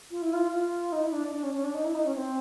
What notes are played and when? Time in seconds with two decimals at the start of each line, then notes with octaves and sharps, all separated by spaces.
0.11 F4
0.22 E4
0.33 F4
0.52 F4
0.92 D#4
1.03 E4
1.13 D4
1.33 D4
1.43 C#4
1.54 C#4
1.64 D4
1.74 D#4
1.85 E4
1.95 D#4
2.05 C#4
2.15 C4